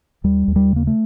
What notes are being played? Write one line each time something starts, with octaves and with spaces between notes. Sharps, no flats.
D#2 G3
D#2
G3
C#3 A#3
A3